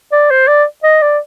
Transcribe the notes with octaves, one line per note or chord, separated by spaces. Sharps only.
D5
C5
D5
D#5
D5